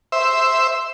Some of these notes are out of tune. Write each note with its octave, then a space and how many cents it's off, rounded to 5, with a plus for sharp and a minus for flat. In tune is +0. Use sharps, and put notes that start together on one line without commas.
C5 +0 E5 +0